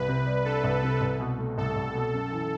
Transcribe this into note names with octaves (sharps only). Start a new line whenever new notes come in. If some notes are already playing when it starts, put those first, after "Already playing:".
Already playing: C2 B4
C3
G3
D4 A4
C2
C3
C2
B2
A3
C2 A4
C2
B2
F#2
E3